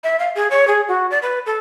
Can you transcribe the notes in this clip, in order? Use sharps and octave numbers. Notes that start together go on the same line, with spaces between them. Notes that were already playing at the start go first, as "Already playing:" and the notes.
E5
F5
G#4
C#5
G#4
F#4
D5
B4
A4